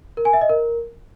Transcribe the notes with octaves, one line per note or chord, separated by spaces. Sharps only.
A#4
G#5
E5
D#5
A#4